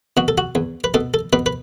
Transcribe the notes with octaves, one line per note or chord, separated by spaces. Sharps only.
B2 F#4
A4
F#4
E2
B4
B2 A4
A4
B2 B4
B4